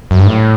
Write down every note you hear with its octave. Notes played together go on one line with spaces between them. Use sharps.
F#2
G2
A2